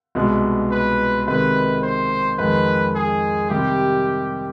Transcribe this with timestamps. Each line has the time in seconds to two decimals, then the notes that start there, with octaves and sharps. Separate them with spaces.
0.15 C2 B2 G#3 B3
0.71 B4
1.27 C3 D#3 G#3 B4
1.83 C5
2.38 F2 D#3 G#3 B4
2.95 G#4
3.50 C3 D#3 G3 G4